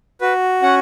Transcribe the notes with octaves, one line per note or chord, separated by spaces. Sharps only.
F#4 B4
C#4 F#5